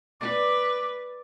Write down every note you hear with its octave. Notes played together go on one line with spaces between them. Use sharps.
B4 D5 D6